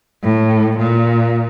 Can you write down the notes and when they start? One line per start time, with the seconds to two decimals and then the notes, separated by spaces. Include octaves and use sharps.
0.23 A2
0.78 A#2